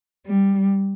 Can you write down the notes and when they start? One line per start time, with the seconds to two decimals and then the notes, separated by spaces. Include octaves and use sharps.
0.26 G3